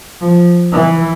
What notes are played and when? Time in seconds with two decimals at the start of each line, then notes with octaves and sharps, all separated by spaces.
0.21 F3
0.73 E3